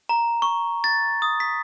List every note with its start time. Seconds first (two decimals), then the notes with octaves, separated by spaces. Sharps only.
0.09 A#5
0.42 C#6
0.84 A6
1.22 D#6
1.40 B6